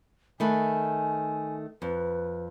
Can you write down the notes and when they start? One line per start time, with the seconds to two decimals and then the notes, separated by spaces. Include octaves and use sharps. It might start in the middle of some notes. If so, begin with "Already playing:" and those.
0.40 D#3 A3 B4 G#5
1.82 F2 B4